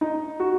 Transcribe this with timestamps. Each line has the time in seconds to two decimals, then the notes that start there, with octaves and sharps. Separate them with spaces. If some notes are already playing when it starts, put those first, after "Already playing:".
0.01 D#4
0.40 F#4